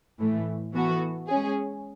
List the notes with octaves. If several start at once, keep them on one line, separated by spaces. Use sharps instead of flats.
A2 E3 A3
E3 B3 F#4 A4
G#3 C#4 G#4